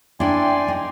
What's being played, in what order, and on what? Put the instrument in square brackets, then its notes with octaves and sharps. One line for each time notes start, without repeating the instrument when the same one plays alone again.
[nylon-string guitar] D4 E4 [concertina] D5 G#5 C6 [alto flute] G5
[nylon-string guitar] D#4